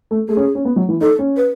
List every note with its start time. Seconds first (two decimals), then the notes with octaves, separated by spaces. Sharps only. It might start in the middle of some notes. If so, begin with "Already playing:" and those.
0.11 A3
0.29 A3 G#4
0.37 C#4
0.55 C#4
0.65 B3
0.76 F#3
0.89 E3
1.01 D#4 A4
1.19 C#4
1.37 B4